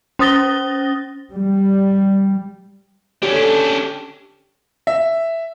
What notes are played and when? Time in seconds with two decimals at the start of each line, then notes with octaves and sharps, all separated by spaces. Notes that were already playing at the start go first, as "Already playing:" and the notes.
0.19 C#4 C5 D#6 A6 A#6 G7
1.32 G3
3.22 D3 C#4 D4 G4
4.87 E5